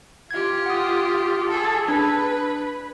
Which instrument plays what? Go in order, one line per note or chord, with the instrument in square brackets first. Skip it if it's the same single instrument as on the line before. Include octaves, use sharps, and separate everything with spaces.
[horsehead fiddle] F4 G4 [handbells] G#6
[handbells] F#5 D#6
[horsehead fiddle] G#4 A4
[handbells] D4 [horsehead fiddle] B4